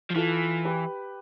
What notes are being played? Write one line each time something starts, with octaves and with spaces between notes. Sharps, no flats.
F3
E3 F4 A4
G4 B4